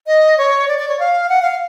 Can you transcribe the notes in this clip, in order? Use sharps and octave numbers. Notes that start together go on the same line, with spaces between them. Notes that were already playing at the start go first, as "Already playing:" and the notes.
D#5
C#5
D5
D5
C#5
F5
F#5
F5